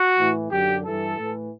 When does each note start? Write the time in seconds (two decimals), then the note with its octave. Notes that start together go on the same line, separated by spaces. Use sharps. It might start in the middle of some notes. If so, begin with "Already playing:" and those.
Already playing: F#4
0.18 A2 E3
0.51 F#2 D3 G4
0.84 G2 E3 A4
1.17 A2 E3